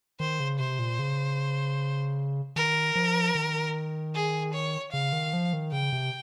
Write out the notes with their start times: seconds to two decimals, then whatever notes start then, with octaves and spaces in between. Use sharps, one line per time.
0.20 D#3 C5
0.40 C#3
0.59 C3 C5
0.79 A#2
0.99 C#3
2.56 D#3 A#4
2.95 F3
3.35 D#3
4.15 G#4
4.54 C#5
4.93 C#3 F5
5.13 D#3
5.33 F3
5.53 D#3
5.72 C#3 G5
5.92 C3